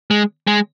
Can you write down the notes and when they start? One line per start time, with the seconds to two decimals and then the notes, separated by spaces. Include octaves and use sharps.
0.11 G#3
0.47 G#3